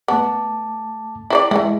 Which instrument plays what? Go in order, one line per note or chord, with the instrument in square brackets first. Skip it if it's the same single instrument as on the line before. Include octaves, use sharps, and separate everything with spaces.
[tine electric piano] A3 A5 D6 [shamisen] B3
[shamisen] E4 C5 D5
[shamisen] E3 E4 [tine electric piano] G#3